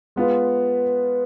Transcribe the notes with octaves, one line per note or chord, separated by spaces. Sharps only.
G#3 B3 F4 B4